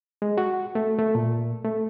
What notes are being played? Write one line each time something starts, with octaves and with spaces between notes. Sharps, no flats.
G#3
F#4
A3
A3
A#2
A3